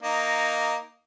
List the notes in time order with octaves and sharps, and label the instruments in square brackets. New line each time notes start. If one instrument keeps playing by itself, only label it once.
[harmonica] A#3 D#4